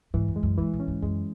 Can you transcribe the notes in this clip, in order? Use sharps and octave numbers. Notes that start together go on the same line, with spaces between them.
G#2 E3
F#2
G#3
F#2
G#2 E3
A2
C#4
G#2
F#2 G#3